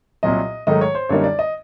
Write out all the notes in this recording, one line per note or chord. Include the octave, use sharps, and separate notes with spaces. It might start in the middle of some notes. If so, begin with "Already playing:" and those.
C2 A#2 F#3 D#5
G#2 D#3 F#3 A3 D#5
C#5
C5
F#2 D3 G3 A#3 D#4 C#5
D5
D#5